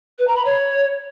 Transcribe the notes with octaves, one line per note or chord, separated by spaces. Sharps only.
B4
A#5
B5
C#5